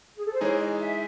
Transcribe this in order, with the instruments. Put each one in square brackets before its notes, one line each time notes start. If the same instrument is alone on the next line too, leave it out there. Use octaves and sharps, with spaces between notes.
[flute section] G#4
A4
C5
[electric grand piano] E3 G#3 D#4 G#4 [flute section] C#5
[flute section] D#5
E5